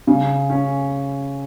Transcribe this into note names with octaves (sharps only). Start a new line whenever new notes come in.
C#3
C#4